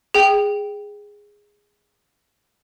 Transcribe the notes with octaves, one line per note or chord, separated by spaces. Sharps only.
G#4 G5